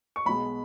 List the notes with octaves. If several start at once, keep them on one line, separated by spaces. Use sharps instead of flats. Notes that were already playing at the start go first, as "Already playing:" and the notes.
C#6
B1 B2 G#3 B5